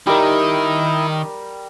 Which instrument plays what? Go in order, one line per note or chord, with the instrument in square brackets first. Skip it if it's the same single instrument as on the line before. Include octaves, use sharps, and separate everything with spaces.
[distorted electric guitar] D#3 [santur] G3 A#4 [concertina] E4 D#5